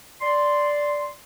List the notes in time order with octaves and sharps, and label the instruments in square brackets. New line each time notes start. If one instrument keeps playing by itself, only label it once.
[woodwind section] D5 C6